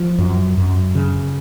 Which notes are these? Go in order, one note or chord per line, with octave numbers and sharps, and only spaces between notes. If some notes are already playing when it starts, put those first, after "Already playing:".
Already playing: F3
F#2
F#2
C#3